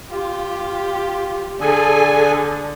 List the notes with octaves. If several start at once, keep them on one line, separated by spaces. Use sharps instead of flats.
F4 G4
D3 G#4 A4 G#5